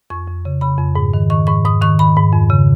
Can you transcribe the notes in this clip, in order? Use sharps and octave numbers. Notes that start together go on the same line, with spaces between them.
F2 C#6
F2
C#3
C#3 B5
F2
G#2
D#3
D#3 C#6
G#2 C#6
G#2 D#6
D#3 C#6
D#3 B5
G#2
F2
C#3